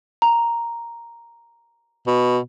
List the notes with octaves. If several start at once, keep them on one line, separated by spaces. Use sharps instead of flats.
A#5
B2